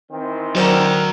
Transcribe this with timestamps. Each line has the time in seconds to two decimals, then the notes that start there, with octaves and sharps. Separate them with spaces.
0.12 D#3 E3 C4
0.56 F#3 F#4 A#4 C5 D5 G5